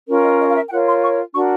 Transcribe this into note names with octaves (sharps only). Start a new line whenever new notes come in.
C#4 F4 A#4
D#5
D#5
F5
E5
G5
F4 A#4 C#5 F#5
C6
C#6
D4 F#4 A#4 C#6